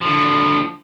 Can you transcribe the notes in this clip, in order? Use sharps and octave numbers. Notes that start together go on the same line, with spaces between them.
D3 F3